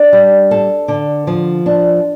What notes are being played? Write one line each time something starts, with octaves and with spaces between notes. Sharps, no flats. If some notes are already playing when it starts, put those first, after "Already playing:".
Already playing: D4
G3
A4
D3
F3
D4